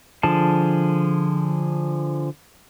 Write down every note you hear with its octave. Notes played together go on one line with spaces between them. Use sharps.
D3 F3 G#4 A5